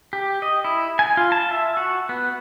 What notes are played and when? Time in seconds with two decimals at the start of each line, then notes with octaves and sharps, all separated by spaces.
0.13 G4
0.42 D#5
0.64 E4
0.99 G#5
1.17 F4
1.32 A5
1.51 E5
1.77 F#4
2.09 B3